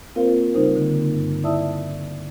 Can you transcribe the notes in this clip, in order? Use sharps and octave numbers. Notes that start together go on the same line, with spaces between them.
A#3 C4 F4 A#4 C5 F5
C#3 G3 D#4 A#4 C5
D3 A#3
G2
E4 D5 E5 A5 D#6 E6